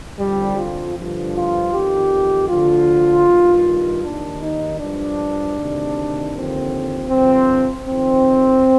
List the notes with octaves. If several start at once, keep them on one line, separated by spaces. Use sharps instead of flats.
F2 D3 F3 G3
F4
G2 D3 F3
F4
F2 D#3 G4
D2 D3 F3 F4
G2 D#3
D#2 D#3 D4
D#4
G2 F3 D4
D2 C3 D#3
D#2 D3 F3 C4
G2 D3 F3 C4
F2 D#3 C4